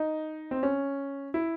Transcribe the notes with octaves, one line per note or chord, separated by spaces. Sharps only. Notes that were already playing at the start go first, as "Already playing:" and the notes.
Already playing: D#4
C4
C#4
E4